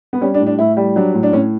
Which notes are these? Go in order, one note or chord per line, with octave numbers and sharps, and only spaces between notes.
B3
G3 C#4
D4
A2
D4
A2 E4
G3
F#3 D4
A2
D4
A2 C#4